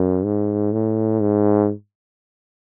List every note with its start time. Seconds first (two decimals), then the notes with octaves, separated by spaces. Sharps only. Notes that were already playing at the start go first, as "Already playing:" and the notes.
Already playing: F#2
0.25 G#2
0.73 A2
1.21 G#2